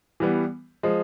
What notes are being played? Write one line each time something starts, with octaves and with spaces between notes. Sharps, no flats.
E3 G3 B3
F3 G#3